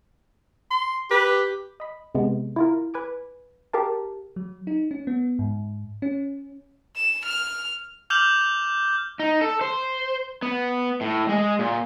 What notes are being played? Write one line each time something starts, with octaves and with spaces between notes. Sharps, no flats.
C6
G4 B4
D#5 B5
C3 G#3 B3
E4 F4 A#4
B4 G#5 D6
G4 G#4 A#4 F5 A5
F#3
D#4
C#4
B3
G#2
C#4
E7
F6
D6 F6 G6 F7 F#7
D#4
A4
C5
B3
A2
G#3
A#2